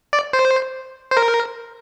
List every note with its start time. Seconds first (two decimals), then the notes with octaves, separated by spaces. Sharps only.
0.13 D5
0.33 C5
1.11 C5
1.17 A#4